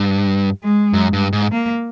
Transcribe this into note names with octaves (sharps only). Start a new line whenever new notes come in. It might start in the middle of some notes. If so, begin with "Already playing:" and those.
Already playing: G2
G#3
F#2
G2
G#2
A#3